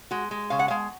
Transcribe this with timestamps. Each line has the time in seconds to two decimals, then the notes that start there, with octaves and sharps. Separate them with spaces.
0.11 G#3 F#4
0.31 G#3
0.50 C#3 F5
0.59 F#5
0.68 G#3 F5